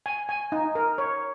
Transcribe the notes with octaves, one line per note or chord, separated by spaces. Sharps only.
G#5
G#5
D#4
A#4
C#5